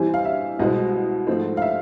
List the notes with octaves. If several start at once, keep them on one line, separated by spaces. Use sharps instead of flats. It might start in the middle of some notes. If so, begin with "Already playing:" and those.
Already playing: C3 E3 G3 C4 E4 G#5
F5
E5
C2 B2 G#3 C4 D#5
G#2 F3 A3 C4
F5
E5